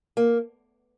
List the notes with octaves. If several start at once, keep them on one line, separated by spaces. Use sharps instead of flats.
A#3